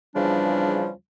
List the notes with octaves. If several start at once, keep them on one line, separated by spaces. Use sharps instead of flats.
E2 C#3 F3 G3 D4